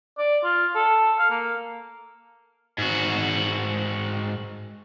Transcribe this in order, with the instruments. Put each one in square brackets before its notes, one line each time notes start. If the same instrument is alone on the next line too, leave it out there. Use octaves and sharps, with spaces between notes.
[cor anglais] D5
F4
A4
F5
A#3
[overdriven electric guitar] G#2 F#4